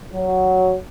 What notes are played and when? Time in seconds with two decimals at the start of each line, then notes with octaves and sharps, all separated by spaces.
0.13 F#3